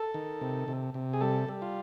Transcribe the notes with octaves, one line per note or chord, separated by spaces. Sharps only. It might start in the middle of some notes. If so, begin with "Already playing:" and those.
Already playing: A4
D#3
C3
C3
C3
G#4
G3 A4
G3
F4